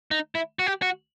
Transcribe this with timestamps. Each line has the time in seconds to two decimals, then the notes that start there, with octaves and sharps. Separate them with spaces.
0.11 D#4
0.35 E4
0.59 F#4
0.67 G4
0.82 F#4